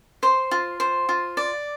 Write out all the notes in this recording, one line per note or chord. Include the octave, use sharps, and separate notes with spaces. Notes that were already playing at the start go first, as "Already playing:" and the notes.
C5 C6
F4
C5
F4
D5